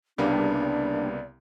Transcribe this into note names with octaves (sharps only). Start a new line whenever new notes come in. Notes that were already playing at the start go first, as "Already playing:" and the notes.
C2 C#3 G3 A#3 B3 D4 D5